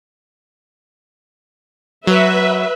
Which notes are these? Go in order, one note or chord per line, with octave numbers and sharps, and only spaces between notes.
F#3 B4 E5